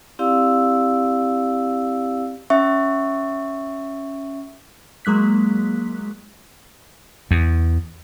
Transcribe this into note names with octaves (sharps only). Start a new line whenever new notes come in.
C4 E4 G4 D5 F5 E6
C#4 E5 C#6
F#3 G#3 A#3 F#6 B6
E2